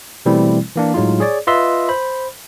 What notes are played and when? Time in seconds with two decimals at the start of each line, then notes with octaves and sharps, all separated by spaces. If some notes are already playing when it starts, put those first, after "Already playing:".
0.26 B2 E3 G3 A3 C4 E4
0.76 E3 A#3 D4
0.94 A2 F#3 G#3 D#4 F4
1.20 G#4 C#5 D5
1.47 F4 B4 D#5 E5 C6 E6
1.89 C5 B5